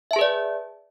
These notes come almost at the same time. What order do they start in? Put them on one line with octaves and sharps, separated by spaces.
E5 A5 G#4 B4 D5